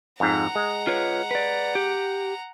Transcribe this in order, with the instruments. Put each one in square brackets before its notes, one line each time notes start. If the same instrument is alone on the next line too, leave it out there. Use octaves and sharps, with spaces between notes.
[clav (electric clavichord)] F2 G#2 [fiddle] F#5 A#5
[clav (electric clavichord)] G#3
[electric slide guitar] F4 B4 C#5
B4 D5
G4